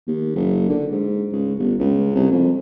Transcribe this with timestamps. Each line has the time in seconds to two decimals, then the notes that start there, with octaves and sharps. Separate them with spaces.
0.08 D#2
0.36 F#1
0.69 D3
0.92 G#2
1.32 C#2
1.59 G1
1.80 C#2
2.15 C2
2.32 F2